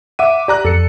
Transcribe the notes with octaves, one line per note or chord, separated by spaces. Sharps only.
E5 F#5 D6 D#7
G4 D5 A#5 F#6
F2 A4 C#7